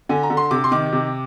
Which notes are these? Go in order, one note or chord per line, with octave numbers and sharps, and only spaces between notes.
D3 G#5
A#5
D3
C6
C3 D6
C6
D#3 D6
C3